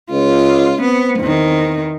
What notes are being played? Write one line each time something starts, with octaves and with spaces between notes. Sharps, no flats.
C#2 F4
B3 C4
E2 D#3